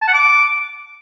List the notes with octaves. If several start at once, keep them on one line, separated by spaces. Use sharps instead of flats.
A5
F#5
D6